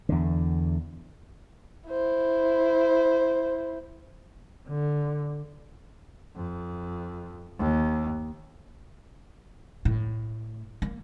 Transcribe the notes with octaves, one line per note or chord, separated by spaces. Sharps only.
E2 D3
E4 C5
D3
F2
D#2
A2
A#3